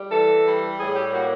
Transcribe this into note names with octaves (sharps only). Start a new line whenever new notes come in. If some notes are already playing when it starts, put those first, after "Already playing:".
Already playing: G3
E3 A4
G3
A2 G#4
G4
A#3 F#4